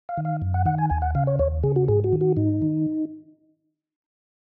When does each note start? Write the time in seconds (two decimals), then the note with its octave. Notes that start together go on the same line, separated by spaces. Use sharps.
0.09 F5
0.17 D#3
0.25 F5
0.42 F#2
0.54 F#5
0.66 D#3 F#5
0.78 G#5
0.90 D#2 G#5
1.02 F#5
1.15 C#3 F5
1.27 C#5
1.39 D#2 C#5
1.63 C#3 G#4
1.76 F#4
1.88 G#2 G#4
2.04 F#4
2.13 D#3
2.21 F#4
2.37 G#2 D#4
2.62 D#3